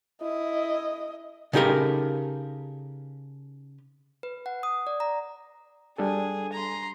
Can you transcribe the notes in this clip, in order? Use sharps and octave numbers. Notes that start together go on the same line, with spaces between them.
E4 D#5
C#3 D#4 G4 A4 A#4
B4
F#5
D#6
D5
A#5
G3 D4 G#4 A4
A#5 C6